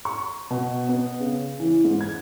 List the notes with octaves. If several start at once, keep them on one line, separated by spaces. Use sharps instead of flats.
C#6
B2
B3
C#3
E3
G#2
G#6